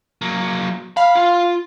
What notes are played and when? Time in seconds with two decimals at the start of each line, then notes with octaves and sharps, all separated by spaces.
0.22 F#3 A#3
0.97 F5 B5
1.15 F4